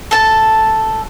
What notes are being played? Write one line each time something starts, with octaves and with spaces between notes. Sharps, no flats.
A4 A5